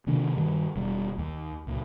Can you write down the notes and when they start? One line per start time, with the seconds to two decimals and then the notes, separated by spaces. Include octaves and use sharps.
0.07 C3 D#3 A#3 D4
0.36 G2 D#3 G3
0.76 E1 G3
1.18 D#2
1.67 C#2 A#2